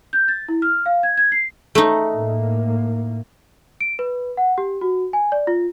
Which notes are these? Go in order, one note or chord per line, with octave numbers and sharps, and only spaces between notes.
G6
A6
E4
F6
F5
G#6
G#6
C7
A3 D#4
A2 A#3
D7
B4
F#5
G4
F#4
G#5
D5
F4